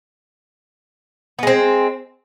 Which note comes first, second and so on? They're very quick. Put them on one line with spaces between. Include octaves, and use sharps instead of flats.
B3 G#3 C4